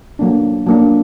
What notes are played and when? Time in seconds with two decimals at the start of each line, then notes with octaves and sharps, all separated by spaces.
0.19 F#3 A#3 D4
0.66 F#3 A#3 D4